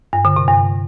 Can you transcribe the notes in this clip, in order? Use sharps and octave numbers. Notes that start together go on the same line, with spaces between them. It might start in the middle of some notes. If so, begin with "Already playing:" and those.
G2
D3
C3
G2